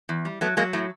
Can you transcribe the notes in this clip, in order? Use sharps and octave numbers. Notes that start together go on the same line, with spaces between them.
E2
G3
F#3 A3 B3
F#3 G#3 A#3
A2 A3